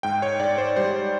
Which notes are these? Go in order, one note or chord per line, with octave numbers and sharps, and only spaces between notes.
G#2 G5
C#5
G#2 D5
C5
G3 C5